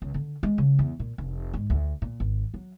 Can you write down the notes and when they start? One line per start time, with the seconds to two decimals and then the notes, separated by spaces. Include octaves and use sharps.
0.02 C#2
0.14 D3
0.43 G#3
0.58 C#3
0.79 E2
1.00 A#2
1.18 F1
1.54 G#2
1.70 D2
2.02 A#2
2.20 G#1
2.54 F#3